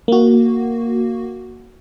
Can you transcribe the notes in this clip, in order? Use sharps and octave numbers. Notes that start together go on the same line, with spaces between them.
A#3 F#4